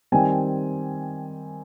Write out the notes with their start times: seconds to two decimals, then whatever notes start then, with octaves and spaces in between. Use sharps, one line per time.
0.12 D#3 G3 C4 G#5